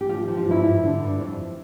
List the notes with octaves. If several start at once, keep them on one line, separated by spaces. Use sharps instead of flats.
G4
F3 F4
F3
F4
G2 E4
G2
D3
G2
F2